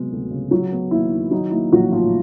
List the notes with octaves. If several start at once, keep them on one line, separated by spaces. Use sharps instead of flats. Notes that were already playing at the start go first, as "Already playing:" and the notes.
Already playing: C3 F#3 G#3 B3
D2
C#3
F#3 F#4
B3
D#2 E4
D#3
F#3 D#4
A#3 E4
A#1 F#3 F#4
A2 F3 F4